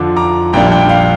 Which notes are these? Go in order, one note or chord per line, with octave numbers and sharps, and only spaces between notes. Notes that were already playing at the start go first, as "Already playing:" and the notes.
Already playing: F2 D3 F3 D6
A#5 D6
A#1 A#2 G3 A#3 D4 G5 A#5
G5
F5